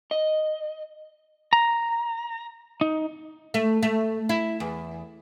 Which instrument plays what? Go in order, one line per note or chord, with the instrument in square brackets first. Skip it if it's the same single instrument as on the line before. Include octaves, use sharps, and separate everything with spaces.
[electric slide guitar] D#5
A#5
D#4
[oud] A3
A3
E4
E2